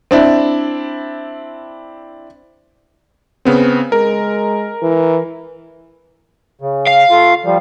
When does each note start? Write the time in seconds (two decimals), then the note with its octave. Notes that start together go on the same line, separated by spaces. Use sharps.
0.11 C4 D4 E4
3.45 C#3 B3 C4
3.92 G#3 A#4
4.82 E3
6.61 C#3
6.87 F5
7.11 A3 F4
7.45 F3 G3